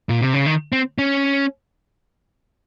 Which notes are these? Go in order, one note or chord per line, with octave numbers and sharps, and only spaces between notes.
A#2
C3
C#3
D#3
C4
C#4